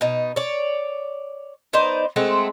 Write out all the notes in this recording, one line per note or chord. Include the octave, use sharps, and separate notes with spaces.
B2 D#4
C#5 D5
B3 D#4 C5 D5
G#3 A3 C4 F#5